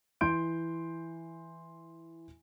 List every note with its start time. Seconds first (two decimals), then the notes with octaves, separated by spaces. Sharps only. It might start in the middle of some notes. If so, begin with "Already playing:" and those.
0.21 E3 C6 G6 D7